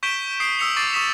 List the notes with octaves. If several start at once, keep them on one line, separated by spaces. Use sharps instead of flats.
C#6 G6 B6 D7 E7 G7
D#6 C7 D7
D#6 E6 B6 C#7 F7
C#6 D6 A6 C7 D7
C#6 D#6 B6 E7 F7